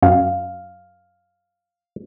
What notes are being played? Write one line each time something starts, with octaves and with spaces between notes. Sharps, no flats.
F#2 F5